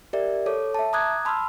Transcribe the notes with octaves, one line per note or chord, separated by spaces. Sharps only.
G4 A#4 D5 E5
A4 C#5 D6
E5 A5
A#5 D6 D#6 F#6 G#6
A5 B5 C6 E6 F6